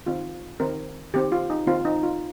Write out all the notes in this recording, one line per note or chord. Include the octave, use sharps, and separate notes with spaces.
D#3 C4 F4
D#3 C4 A#4
D#3 C4 G4
F4
D#4
D#3 C4 F4
D#4
F4